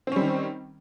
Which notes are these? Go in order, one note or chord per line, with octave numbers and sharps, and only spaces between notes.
D#3 G3 C4 C#4